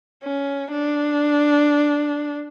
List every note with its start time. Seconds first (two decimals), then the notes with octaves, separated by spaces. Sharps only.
0.24 C#4
0.72 D4